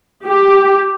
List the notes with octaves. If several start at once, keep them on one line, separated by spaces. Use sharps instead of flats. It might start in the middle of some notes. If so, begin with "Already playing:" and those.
G4